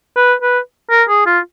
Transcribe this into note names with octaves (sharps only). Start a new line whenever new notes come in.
B4
B4
A#4
G#4
F4